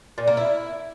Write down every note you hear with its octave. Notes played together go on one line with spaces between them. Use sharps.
A#2
A#3
E4